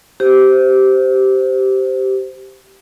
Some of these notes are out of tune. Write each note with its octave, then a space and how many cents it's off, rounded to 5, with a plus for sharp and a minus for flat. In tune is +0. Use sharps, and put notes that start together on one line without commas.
G4 -15 C5 -10